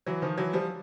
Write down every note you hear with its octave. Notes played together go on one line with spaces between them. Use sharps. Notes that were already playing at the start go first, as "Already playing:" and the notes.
E3 F#3
D#3 F3
E3 F#3
F3 G3